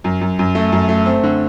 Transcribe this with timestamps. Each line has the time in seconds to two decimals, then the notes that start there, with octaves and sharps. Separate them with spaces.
0.04 F#2
0.21 F#2
0.39 F#2
0.55 A3
0.72 F#2
0.89 A3
1.06 C4
1.23 D3